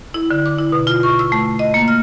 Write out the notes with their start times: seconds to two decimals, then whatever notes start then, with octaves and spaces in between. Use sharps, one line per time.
0.14 E4
0.31 D3
0.46 D6
0.58 E4
0.72 B2
0.87 F4
1.03 C#6
1.19 E6
1.32 A3
1.59 D#5
1.74 A#3
1.88 F6